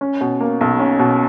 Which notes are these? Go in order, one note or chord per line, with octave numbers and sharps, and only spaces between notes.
C#4
B2
A#3
B1
C#4
B2